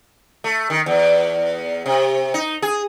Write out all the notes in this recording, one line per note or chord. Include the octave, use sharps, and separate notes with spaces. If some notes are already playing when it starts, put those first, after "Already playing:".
A3
D#3
E2
C3
D#4
G#4